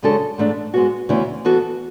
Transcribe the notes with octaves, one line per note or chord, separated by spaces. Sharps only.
F#2 C#3 G#3 D4 A4
G#2 E3 A3 D4
G#2 G#3 B3 F#4
D2 C#3 E3 B3 E4
E3 B3 F#4 A4